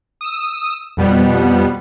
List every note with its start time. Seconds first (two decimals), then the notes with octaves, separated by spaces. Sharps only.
0.21 D#6 E6
0.97 F2 B2 G3 B3